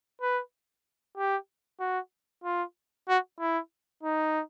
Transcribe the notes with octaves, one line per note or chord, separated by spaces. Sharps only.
B4
G4
F#4
F4
F#4
E4
D#4